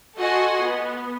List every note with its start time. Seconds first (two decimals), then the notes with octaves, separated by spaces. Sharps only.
0.17 F#4 A4 D#5 F#5 G#5 C6
0.61 B3